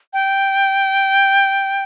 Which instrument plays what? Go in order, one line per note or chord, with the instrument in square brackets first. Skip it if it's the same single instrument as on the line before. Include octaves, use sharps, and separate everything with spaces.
[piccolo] G5